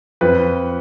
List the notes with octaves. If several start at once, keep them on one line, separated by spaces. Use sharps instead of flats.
F2 B4